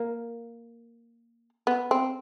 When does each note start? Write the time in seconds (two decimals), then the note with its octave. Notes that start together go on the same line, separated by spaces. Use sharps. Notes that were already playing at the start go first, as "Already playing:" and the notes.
Already playing: A#3
1.67 B3
1.91 C4